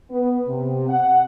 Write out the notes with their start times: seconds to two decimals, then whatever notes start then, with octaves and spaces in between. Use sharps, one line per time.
0.10 B3
0.47 C3
0.88 F#5